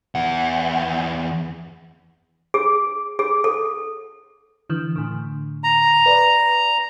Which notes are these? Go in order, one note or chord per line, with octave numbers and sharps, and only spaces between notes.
E2 F#5
G#4
G#4
A4
D3 E3
A2 D3
A#5
B4 D5